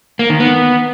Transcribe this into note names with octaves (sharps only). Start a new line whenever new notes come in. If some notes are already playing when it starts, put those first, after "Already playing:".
A#3
D#3
B3